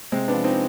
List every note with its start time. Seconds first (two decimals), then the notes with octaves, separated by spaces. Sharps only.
0.12 C3 G#3 C4
0.28 B3 D4
0.33 F3
0.44 C4 D#4